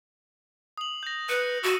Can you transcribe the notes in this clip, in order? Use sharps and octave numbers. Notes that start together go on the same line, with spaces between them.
D#6 F#7
G6 A#6
B4 F#6 C#7
F#4 E6 D#7